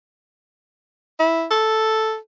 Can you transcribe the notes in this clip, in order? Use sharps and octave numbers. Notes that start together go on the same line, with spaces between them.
E4
A4